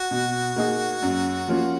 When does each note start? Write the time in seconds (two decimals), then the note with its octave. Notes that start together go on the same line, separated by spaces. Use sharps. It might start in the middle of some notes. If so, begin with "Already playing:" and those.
Already playing: F#4
0.11 B2
0.56 A#3 D#4 G#4
1.02 F#2
1.48 F3 A#3 C#4 F4